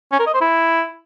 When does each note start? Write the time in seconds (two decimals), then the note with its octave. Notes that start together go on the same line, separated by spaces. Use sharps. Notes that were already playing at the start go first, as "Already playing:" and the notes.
0.12 C#4
0.19 A#4
0.27 D#5
0.34 C5
0.41 E4